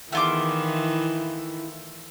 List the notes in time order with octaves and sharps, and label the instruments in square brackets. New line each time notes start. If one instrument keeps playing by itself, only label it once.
[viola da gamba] D#3 E3 [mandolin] A3 F4 D6 [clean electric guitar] E4 F#5